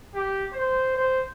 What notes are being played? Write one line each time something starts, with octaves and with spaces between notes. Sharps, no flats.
G4
C5
C5